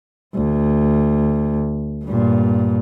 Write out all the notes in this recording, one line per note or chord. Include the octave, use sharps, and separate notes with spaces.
D2
G2 A#2